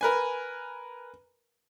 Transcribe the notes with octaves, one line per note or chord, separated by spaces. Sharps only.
A#4 B4 G#5